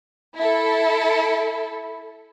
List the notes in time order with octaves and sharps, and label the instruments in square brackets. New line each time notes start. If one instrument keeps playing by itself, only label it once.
[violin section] E4 A4